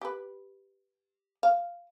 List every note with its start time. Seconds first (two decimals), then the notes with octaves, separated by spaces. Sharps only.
0.01 G4 B4
1.43 F5